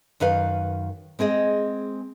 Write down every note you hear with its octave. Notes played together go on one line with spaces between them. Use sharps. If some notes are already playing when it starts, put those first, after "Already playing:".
F#2 D#3 B4 F5
G#3 C4 G#4 D#5